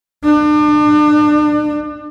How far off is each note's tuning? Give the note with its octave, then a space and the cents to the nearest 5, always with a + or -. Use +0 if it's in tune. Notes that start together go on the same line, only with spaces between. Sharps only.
D4 +35